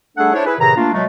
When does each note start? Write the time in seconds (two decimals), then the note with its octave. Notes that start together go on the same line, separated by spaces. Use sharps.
0.17 G3 A3 D4 G#4 A4 F#5
0.33 D4 E4 C5 C#5
0.46 E4 G#4 B4
0.59 A2 C3 D#3 G#4 B4 A#5
0.76 A3 A#3 D4 F4
0.94 B2 F#3 G#3 A3